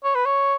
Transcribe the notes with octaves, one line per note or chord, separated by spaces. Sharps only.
C#5
B4
C#5